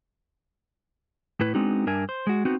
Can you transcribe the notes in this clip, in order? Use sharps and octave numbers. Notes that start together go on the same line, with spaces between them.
A2 E4 B4
G#3 B3 C4 D4 D#4 F#4
G2 D4 A#4 E5 G#5
C5
G#3 F#4
B3 C4 D#4 F#4